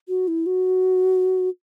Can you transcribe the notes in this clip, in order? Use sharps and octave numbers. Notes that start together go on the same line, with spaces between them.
F#4
E4
F#4